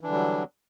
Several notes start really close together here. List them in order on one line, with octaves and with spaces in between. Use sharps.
E3 D4 D3 G3 F#3